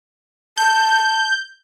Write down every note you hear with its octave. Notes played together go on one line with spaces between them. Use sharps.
A5 G6